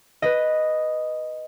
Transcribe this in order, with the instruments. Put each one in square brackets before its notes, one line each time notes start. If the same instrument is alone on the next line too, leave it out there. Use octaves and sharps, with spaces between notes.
[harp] B4 D#5